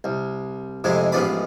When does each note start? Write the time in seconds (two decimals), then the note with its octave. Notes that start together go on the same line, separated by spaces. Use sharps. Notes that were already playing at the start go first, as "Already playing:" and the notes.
0.04 C2
0.84 F2 A2 C3 G#3 E4
1.12 A1 G#2 F3 B3 D5 B5